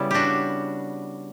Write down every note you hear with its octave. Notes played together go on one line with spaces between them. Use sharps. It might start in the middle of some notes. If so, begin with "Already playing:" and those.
Already playing: C#3 G3 B3 E4
D4 F#4 G4